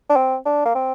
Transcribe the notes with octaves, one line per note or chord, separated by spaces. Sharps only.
D4
C4
D4
A#3
C4